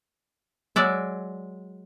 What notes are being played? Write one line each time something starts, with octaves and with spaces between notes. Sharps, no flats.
F#3 G#3 D5 E5